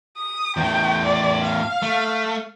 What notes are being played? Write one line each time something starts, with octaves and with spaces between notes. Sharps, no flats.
D#6
E2 A2 G5
D5
F5
A3